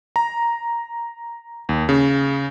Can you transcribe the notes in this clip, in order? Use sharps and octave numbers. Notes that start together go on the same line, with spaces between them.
A#5
D#2
C#3